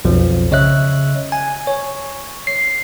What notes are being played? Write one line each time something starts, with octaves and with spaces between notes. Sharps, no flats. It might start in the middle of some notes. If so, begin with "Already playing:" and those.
B1 F2 F3
C#3 C#5 D#5 E5 F#6
G#5
C#5
C7